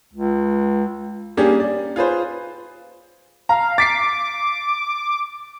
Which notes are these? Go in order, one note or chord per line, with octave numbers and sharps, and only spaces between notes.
C#2
G3 A#3 C#4 D4 G4 G#4
D5
F4 G#4 B4 C5
F5 A#5
D6 A6 B6 C7